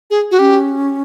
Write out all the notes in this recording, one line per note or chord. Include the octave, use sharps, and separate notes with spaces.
G#4
F#4
C#4 G4